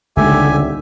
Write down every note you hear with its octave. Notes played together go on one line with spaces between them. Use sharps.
D#1 C#2 D3 G#3 G4 E5 G#5